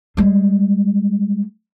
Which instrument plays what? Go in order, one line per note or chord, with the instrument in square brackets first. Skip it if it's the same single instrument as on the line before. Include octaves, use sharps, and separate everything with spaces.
[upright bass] G3 G#3